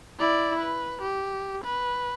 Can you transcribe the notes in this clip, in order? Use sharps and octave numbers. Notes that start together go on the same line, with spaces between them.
E4 D5
B4
G4
B4